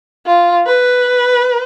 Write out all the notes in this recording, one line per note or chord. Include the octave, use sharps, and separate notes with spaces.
F4
B4